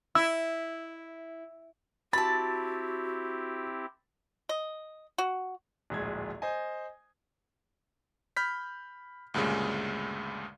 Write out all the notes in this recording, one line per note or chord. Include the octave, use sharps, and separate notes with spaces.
E4 E6
C4 E4 F#4 G4 A5 B5 A6
D#5
F#4
D1 A#1 G#3 G#6
C5 D#5 G#5
B5 F6 G6 B6
D2 G2 A#2 C#3 G#3